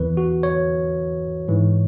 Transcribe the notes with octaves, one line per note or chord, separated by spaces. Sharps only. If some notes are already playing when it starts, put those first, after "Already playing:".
Already playing: E2 E3 B4
F#4
C#5
G#2 E3